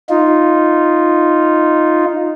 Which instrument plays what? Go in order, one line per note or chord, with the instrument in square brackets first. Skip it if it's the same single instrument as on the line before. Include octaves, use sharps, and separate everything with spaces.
[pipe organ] D#4 F4